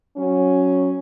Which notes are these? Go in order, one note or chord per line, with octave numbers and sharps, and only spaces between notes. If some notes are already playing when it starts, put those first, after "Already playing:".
F#3 C#4